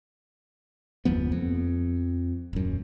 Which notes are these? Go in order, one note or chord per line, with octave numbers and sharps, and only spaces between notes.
F#1 D#2 F3 B3
F2
D#1 F#2